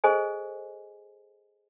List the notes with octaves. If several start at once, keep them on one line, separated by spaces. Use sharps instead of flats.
G#4 A4 C5 D#5 G#5